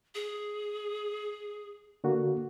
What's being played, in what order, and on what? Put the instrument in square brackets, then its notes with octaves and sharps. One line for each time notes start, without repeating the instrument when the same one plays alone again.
[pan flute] G#4
[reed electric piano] D3 A#3 F#4